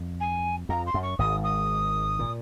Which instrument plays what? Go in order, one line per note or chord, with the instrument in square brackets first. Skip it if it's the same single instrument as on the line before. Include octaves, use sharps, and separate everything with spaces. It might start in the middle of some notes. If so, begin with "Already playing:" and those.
Already playing: [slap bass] F2
[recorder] G#5
[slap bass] F2 [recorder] A#5
[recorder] C6
[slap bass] F#2
[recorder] C#6
[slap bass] G#1 G#2 [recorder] D#6
[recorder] D#6
[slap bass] A#2